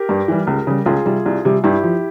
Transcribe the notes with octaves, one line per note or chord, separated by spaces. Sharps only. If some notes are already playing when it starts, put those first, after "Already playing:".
Already playing: G4 A#4
G2
E3 G3
C#2
C#3 G3
C#2 F4 G#4
C3 G3
C2
C3 G3
G2 E4 G4
F3